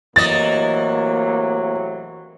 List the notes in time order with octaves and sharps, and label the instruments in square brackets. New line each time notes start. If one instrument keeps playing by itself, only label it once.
[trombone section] A2 C3 F#3 [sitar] E3 D#5 [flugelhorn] A#3 [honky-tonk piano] A6